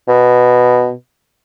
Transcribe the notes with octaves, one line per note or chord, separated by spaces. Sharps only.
B2